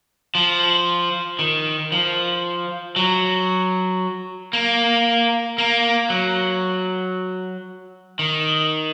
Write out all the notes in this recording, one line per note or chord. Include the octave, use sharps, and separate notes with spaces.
F3
D#3
F3
F#3
A#3
A#3
F#3
D#3